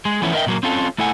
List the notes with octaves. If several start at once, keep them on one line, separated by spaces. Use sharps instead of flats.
G#3 G#4
E3 F3 A3 B3 C#4 E4
A#4 D#5 E5 F#5 G5
A#2 F#3 A#3
C4 C#4 F4 A4
A3 E4 A4 F#5 G#5